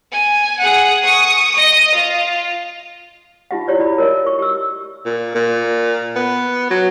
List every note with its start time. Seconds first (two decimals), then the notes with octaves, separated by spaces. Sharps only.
0.12 G#5
0.59 G#4 F#5
1.04 C#6 D#6
1.51 D#5 D#6
1.94 F4
3.51 D#4 F4 G4 E5 F#5
3.68 E4 G4 C#5 D5
3.79 E4 F#4 D5 B5
3.98 A#4 C#5 D#5 E5
4.26 C#6
4.39 G4 E6
5.06 A#2
5.35 A#2
6.16 B3
6.70 F#3